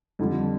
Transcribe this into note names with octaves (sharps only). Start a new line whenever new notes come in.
F2 D3 G3